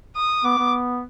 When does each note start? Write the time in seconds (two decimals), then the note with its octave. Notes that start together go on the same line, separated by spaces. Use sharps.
0.16 D#6
0.44 B3 D6
0.58 B3